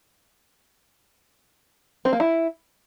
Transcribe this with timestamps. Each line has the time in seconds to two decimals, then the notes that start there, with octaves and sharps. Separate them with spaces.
2.05 C4
2.13 A#3
2.20 E4